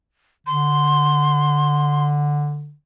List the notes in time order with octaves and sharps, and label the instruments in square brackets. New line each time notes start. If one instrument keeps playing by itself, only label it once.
[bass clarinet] D3 [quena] C6